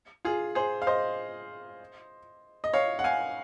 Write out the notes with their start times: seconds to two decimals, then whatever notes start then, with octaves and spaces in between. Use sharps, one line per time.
0.25 F4 G#4
0.55 G#4 C5
0.82 F5
0.87 C5 D#5
2.64 D#5
2.73 C#5 F5
2.99 F#5
3.04 F5 G#5